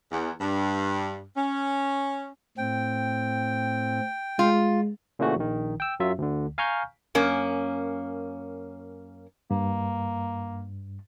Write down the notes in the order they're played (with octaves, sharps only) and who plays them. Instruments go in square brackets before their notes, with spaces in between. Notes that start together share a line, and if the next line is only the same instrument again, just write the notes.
[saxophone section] E2
G2
C#4
[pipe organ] A2 C4 [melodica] G5
[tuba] G#3 [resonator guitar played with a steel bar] F4
[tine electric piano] A#2 C#3 E3 A3 F#4
A#1 D#3
G5 E6
F#2 F#3 F4 E5
D2 D3
F5 G#5 A#5 C#6 F6 G6
[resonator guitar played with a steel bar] F#2 A#3 C#4
[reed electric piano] G2 [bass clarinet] A#3